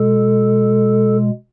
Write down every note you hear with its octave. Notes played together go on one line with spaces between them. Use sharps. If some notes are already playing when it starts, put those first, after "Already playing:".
Already playing: B2 G#3 A4